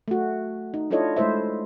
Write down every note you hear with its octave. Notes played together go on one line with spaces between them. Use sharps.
A3 F#4
D#4
D4 E4 F4 A4 C#5 D#5
G#3 A3 E4 C5 E5